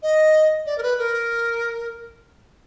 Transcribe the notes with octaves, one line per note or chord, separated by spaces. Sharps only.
D#5
D5
A#4
B4
A#4